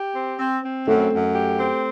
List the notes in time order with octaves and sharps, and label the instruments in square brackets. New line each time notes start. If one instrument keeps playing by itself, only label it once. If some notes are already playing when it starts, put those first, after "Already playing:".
Already playing: [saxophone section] G4
C4
C4
C4
[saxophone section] F#2 [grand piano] A3
[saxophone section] F#2
G4
C4